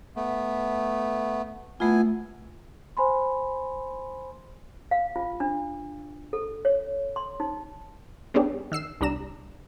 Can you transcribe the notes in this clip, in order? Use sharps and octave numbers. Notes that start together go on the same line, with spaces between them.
A3 B3
A3 B3 E4 F4 G#5
C5 G#5 B5 C6
F5
F4
D4
A4
C#5
C6
D#4
G3 B3 C#4 D4 G4 G#4
D#3 E6 C7 E7
C2 G3 D4 A#5 E7